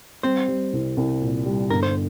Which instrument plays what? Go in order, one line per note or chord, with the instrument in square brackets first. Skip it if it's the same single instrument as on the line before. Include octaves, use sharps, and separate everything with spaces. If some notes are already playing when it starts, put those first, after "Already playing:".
[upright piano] G3 [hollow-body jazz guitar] C4 C5
[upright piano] G3
C2
C2
A#2
G3
[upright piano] G1 [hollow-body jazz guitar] A#4
[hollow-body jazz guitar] C5